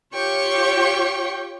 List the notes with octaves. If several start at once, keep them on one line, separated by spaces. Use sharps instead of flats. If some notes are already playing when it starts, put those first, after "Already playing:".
F4 G4 C#5 G5 C#6